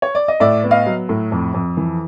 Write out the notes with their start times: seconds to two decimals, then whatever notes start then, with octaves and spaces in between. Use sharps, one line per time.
0.02 C#5
0.15 D5
0.28 D#5
0.40 A2 D5 E5
0.64 B3
0.71 D#5 F5
0.86 F#3
1.09 A2
1.32 F2
1.54 F2
1.77 E3